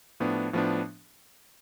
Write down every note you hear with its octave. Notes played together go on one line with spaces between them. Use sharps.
A2 F3 B3 D4
A2 F3 B3 D4